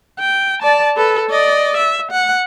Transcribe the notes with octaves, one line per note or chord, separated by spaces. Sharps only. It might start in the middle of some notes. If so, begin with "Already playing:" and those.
G5
D5 A5
A4 B4
D5 D#5
E5
F#5